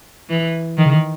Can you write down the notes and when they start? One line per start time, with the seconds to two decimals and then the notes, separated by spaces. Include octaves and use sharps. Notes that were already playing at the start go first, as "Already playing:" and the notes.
0.30 E3
0.78 D#3 E3
0.86 C#3
0.94 D#3